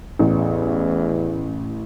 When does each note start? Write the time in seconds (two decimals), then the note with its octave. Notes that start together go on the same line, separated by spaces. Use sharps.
0.19 A1 E2